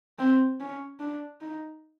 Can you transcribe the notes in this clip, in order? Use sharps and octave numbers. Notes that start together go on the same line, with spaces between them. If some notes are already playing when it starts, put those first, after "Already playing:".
C4
C#4
D4
D#4